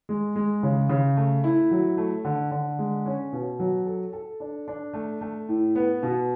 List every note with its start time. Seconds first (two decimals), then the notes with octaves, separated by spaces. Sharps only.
0.09 G#3
0.36 G#3
0.63 C#3
0.89 C#3
1.17 A3
1.44 E4
1.71 F#3
1.98 A3
2.25 D3
2.51 D3
2.79 G#3
3.06 C#4
3.32 B2
3.59 F#3
3.86 A4
4.13 A4
4.40 D4
4.68 D4
4.93 A3
5.21 A3
5.49 A2
5.75 B3
6.03 B2